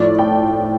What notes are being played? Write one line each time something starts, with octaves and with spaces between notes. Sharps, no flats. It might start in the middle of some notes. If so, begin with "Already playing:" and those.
Already playing: A2 F3 D5
G5